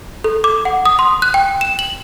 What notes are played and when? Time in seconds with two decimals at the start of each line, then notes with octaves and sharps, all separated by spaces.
0.24 A4
0.44 D6
0.65 F#5
0.85 D#6
0.99 C6
1.22 F#6
1.34 G5
1.61 E7
1.79 F#7